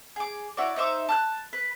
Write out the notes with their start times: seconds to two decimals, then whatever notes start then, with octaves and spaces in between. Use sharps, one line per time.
0.16 G#4 D6
0.57 E4 F#4 C#5 D5
0.76 D#4 C5 E5 D6
1.09 A5 F6 F#6
1.53 B4